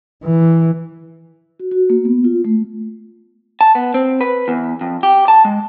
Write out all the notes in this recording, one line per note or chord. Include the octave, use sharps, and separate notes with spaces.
E3
F#4
F#4
A#3
B3
F4
A3
A5
B3
C4
B4
E2
F2
G4
A5
G#3